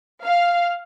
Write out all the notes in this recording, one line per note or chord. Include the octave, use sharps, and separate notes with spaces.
F5